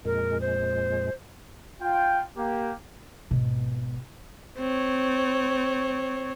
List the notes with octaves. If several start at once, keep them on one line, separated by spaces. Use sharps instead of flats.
F2 A#2 G#3 A#4
C5
F4 G5
A#3 G4
G#1 B2
C4 C#5